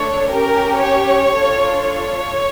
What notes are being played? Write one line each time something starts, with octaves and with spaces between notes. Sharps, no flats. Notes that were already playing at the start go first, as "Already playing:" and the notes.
Already playing: A3 D4 A4 C#5
C#4 G4 A#4
C#5
D4 F4 A4
C#5